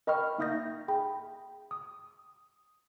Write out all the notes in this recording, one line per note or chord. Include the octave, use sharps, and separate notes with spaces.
A#4 D#5 G5 B5 C#6 F6
A#3 D#4 E5 D#6 G6 A#6
G#4 G5 B5
D#6